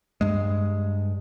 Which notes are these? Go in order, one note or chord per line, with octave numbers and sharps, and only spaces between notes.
G2 G#3